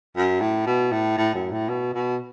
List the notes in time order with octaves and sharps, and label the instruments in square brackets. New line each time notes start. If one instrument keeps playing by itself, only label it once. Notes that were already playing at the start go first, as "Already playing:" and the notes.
[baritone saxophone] F#2
A2
B2
A2
A2
F#2
A2
B2
B2